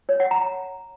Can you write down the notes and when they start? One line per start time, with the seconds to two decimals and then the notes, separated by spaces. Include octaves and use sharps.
0.09 C#5
0.20 F#5
0.31 A#5